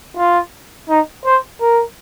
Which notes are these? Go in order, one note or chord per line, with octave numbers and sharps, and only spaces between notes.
F4
D#4
C5
A#4